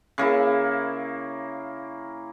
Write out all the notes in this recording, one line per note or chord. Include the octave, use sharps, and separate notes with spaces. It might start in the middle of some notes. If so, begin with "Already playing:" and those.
C#3 A#3 E4